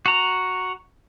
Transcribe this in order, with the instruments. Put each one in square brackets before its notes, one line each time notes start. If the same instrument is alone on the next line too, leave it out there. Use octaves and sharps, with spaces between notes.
[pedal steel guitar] F#4 A#5